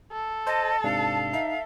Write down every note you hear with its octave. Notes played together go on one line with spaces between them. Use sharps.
A4
C5 D#5 A5
G#2 C3 D4 F5
D#4 E5